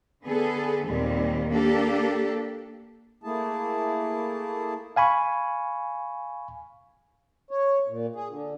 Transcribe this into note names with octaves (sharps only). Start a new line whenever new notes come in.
D3 B3 G#4 A4
D#2 A#2 D#3 G3 C4
A#3 D4 G4 A4
A3 A#3 E4 G#4 A5
F5 G#5 B5 C#6
C#5
A#2
G#4
D3